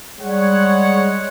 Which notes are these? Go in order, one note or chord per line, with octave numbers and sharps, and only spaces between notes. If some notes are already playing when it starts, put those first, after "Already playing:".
G3 G#3 C#5 F#5